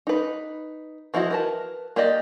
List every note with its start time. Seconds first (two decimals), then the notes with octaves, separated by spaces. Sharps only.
0.07 D#4 B4
1.14 E3 F3 E4 F#4 D#5
1.31 A#4 B4 A5
1.96 A#3 G4 D5 D#5